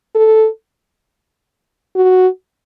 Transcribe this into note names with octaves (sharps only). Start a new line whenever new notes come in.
A4
F#4